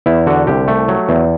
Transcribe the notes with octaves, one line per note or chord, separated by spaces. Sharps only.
E2 E4
D3 F#4
C2 G4
A3
F#3
E2